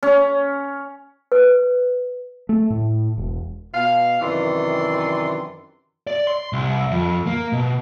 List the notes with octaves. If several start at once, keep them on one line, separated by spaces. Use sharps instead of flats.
C#4
B4
A3
A2
E1
B2 F5
F#2 C3 D#3 E3 D5 C6
D5
C6
C2
F2
A#3
B2